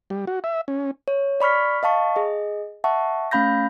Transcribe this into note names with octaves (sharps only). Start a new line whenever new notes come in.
G3
F#4
E5
C#4
C#5
D5 B5 C#6 F6 B6
D#5 F5 A5 C#6
G#4 D#5
E5 F#5 A5 C#6
A3 C#4 F5 B5 G6 A#6